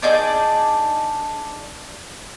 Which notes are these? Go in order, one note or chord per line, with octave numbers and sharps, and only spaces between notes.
D4 D#4 G#4 D5